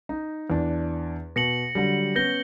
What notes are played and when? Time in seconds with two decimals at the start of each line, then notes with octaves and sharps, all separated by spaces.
0.09 D#4
0.50 E2 D4
1.36 B2 A#6 C#7 F#7
1.75 D3 F#3 G3
2.16 B3 C#4 G6 A#6 G7